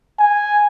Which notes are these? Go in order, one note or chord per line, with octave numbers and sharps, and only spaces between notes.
G#5